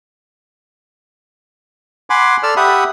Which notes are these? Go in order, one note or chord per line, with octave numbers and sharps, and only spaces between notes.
F#5 G#5 B5 C6 D6
A4 D5 E6 F6
G4 E5 F#5 B5 D#6